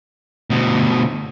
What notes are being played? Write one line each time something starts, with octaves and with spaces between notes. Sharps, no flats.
D2 B2